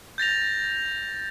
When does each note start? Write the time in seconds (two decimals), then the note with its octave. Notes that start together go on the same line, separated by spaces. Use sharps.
0.18 G6 A6 A#6 F7